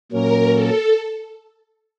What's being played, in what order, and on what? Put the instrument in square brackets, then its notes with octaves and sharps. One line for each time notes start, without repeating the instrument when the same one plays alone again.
[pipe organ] A#2 F#3 A#3 C#4 [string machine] A#4
[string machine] A4